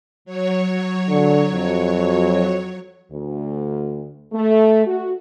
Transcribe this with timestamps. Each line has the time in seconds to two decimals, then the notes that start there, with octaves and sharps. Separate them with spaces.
0.25 F#3 C#5
1.10 D3
1.52 F2
3.11 D2
4.33 A3
4.87 F#4